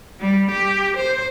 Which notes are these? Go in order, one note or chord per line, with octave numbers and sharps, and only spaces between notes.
G3
G4
C5